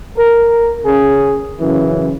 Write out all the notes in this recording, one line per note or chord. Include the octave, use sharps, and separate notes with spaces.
A#4
C#3 C#4 G#4
F#2 C#3 E3